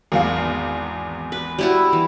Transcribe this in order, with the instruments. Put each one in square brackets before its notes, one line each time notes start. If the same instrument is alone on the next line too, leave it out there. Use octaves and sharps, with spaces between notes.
[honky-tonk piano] G#1 E2 F5
[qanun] B4
G3 E4 F#4
E3